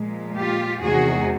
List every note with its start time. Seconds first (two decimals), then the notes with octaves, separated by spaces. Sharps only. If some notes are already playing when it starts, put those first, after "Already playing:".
Already playing: A#2 F3 G#3
0.35 F4 G4
0.81 E2 C3 D#3 G#3 F#4 G#4